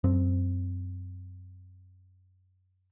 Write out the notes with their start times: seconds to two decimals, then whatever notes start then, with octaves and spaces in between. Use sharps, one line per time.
0.04 F#2 C4